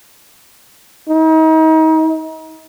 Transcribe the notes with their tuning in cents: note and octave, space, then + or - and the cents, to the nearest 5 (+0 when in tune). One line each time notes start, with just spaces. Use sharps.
D#4 +35